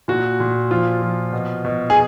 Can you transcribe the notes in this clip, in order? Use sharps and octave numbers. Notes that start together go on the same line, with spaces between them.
A#2 F#4
A#2
F3 F4
F3
B2
B2
G#4